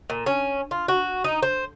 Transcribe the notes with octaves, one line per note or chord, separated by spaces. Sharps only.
A#2
C#4
F4
F#4
D#4
C5